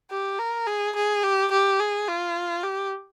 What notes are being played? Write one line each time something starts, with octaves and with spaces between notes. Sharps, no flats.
G4
A#4
G#4
G#4
G4
G4
G#4
F4
G4